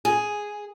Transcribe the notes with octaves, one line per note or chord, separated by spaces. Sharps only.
G#4